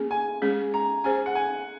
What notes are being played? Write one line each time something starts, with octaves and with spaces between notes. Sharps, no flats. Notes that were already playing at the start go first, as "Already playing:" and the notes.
Already playing: A#3 C#4 G#4
G#5
G#3 C#4 G#4
A#5
C#4 G#4 C5 G#5
F#5
G#5